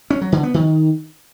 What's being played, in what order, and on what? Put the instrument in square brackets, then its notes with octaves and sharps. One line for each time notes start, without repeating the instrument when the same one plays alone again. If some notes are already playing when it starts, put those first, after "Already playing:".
[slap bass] C#4
F#3
D3
B3
D#3